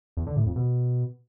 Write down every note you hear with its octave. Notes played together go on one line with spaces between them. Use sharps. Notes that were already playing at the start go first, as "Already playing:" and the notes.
E2
D3
A2
F2
B2